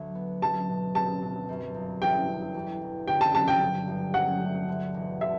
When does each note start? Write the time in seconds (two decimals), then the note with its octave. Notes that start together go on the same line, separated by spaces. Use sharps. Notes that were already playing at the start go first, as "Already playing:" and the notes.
Already playing: D2 F#3
0.15 B3
0.41 F#3 A5
0.69 B2
0.95 C4 A5
1.22 B2
1.49 F#2
1.74 G1
2.01 E3 G5
2.29 A3
2.54 E2
2.82 E1
3.08 D3 G5
3.21 A5
3.35 F#3 A5
3.48 G5
3.62 G2
3.87 G1
4.14 F#3 F#5
4.41 A3
4.68 D2
4.94 E1
5.21 D3 E5